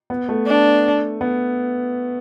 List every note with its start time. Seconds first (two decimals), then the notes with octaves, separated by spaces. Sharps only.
0.10 B3
0.29 A3
0.47 D4
1.21 B3